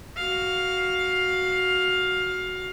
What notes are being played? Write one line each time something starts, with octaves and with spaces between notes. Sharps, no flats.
F#4 F5